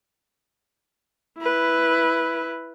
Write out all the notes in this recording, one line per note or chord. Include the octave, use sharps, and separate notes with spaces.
E4 B4